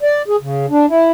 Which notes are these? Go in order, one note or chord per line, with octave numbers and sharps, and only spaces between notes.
D5
G#4
C#3
D4
E4